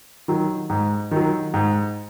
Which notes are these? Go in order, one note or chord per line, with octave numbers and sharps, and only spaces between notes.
D#3 F#3
G#2
D#3 F#3
G#2